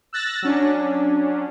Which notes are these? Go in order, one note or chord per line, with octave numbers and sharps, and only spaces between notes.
E6 F#6 A6 A#6
F#3 C#4 D4